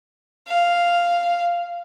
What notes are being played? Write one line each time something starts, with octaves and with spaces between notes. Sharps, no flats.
F5